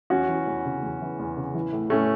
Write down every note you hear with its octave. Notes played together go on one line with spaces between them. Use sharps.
E2 C#4 F#4
E3
E2
C#3
E2
E3
E2
C#3
E3
A2
A2 A3 C#4